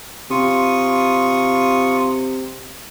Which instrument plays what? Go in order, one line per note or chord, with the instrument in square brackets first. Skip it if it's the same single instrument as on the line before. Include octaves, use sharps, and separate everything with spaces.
[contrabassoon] C3 [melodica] F4 C#6 D#6